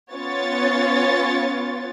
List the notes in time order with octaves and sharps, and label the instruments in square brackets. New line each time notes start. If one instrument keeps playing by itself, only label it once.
[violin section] B3 C#4 F4 C#5 A6